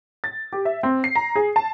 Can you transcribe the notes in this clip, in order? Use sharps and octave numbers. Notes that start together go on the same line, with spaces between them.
A6
G4
E5
C4
C7
A#5
G#4
A5